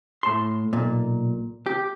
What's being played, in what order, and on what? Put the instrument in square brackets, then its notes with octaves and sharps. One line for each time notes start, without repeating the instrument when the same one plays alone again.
[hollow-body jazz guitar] A2 A5 C6
B1 A#2
G4